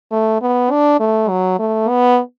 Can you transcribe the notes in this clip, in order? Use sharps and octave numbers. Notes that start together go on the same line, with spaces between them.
A3
B3
D4
A3
F#3
A3
B3